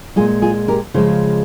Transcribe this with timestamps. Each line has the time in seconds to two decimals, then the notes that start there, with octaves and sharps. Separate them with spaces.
0.16 A#2 G#3 F4 G#4
0.42 F4 G#4
0.68 G4 A#4
0.94 C#3 F3 G#3 G#4 C5